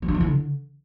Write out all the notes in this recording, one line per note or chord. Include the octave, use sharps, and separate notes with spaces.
G3
D4
F3
E4
D3